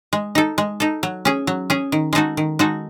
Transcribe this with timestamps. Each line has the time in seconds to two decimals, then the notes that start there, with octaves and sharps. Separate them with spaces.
0.13 G#3
0.35 D#4 A4
0.58 G#3
0.80 D#4 A4
1.03 F#3
1.25 C#4 G#4
1.47 F#3
1.70 C#4 G#4
1.92 D#3
2.13 G#3 D#4 F#4 A4
2.37 D#3
2.59 G#3 D#4 F#4 A4